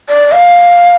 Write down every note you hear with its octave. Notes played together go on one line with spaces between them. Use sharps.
D5
F5